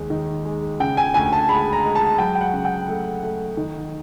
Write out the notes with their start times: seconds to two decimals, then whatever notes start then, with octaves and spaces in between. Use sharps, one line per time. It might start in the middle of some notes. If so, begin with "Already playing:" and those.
Already playing: D#2 G#3
0.10 D#3
0.45 G#3
0.80 C#3 G5
0.97 G#5
1.14 D2 G#5
1.32 A5
1.49 G#3 B5
1.73 A#5
1.84 G#3
1.95 A5
2.18 F#3 G5
2.35 G5
2.41 F#5
2.53 C#3
2.65 G5
2.88 A3
3.23 A3
3.57 D#3